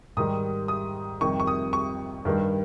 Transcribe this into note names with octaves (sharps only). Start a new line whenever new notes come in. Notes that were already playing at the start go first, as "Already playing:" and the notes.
G#2 D#3 G3 D#6
D#6
F2 C3 D#3 G3 C#6
C#6
D#6
C#6
G2 D#3 G3